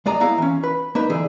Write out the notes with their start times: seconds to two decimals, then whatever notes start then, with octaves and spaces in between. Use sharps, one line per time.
0.06 D2 G#3 D5 D#5 A#5
0.20 B3 E4 F5 A#5
0.38 E3 C#4
0.64 B4
0.95 A#3 D#4 B4
1.10 D3 E3 G#4